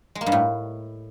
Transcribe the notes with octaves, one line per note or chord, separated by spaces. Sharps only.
G#3
A#3
G2
A2